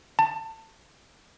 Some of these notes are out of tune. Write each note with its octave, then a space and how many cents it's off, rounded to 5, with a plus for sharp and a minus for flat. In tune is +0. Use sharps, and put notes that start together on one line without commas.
A5 +20